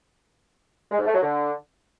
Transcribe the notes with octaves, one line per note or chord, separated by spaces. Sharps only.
G#3
G#2
A3
F#3
D3